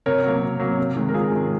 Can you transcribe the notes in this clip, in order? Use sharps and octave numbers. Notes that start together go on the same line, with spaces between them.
C3 A#4 C#5
F#3 A#3
C3
F#3 A#3
C3
D#3 G#3
A#4
C3 F4 G#4
D#3 G#3